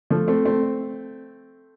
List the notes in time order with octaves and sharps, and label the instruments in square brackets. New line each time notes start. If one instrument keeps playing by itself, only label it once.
[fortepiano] F3 A3
A3 C4
A3 C4